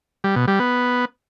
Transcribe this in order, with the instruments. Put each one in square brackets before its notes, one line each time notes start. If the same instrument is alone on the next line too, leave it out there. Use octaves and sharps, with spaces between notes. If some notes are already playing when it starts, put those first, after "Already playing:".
[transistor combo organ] G3
B2
G3
B3